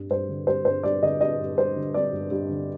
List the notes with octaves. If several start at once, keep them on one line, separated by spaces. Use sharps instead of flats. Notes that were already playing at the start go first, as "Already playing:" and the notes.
Already playing: G2 G3
G2 C5
D3
G3 C5
G2 C5
G2 D5
D3 D#5
G3 D#5
G2
G2 C5
D3
G3 D5
G2
G2
D3